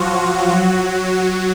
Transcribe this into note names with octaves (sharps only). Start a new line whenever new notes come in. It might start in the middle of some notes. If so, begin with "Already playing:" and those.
Already playing: F3 F#3 F4 F#4
F#3 F#4
F#3 F#4